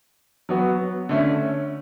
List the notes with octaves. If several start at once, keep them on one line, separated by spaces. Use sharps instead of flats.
F#3 B3 F#4
D3 A3 C#4